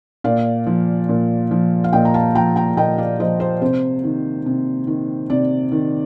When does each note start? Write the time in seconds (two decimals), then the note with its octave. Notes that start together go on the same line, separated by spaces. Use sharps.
0.24 A#2 D5 F5
0.66 F3
1.09 A#2
1.51 F3
1.84 F5
1.93 A#2 D#5 G5
2.05 A#5
2.14 F5 A5
2.35 F3 G5 A#5
2.56 G5 A#5
2.77 A#2 D#5 G5
2.98 D5 F5
3.20 F3 C5 D#5
3.40 C5 D#5
3.62 C3 C5
4.04 D#3
4.46 C3
4.87 D#3
5.30 C3 D5
5.72 D#3